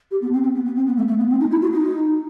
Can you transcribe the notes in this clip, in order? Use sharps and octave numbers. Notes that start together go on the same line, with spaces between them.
G4
B3
C4
C4
B3
B3
C4
B3
A3
A3
B3
C4
D#4
E4
F#4
D#4